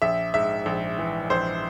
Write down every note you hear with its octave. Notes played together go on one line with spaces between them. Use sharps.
A#1 E5
G#2 E5
A#1
E3
A#1 C5